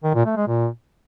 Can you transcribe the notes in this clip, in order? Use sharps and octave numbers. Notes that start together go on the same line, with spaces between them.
D#3
A#2
A3
G#3
A#2